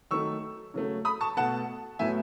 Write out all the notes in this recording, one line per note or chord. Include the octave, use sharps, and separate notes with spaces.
D#3 F#3 A3 C#6 E6
C#3 F#3 A3
B5 D#6
A5 C#6
B2 A3 F#5 A5
A2 F#3 B3 E5 G#5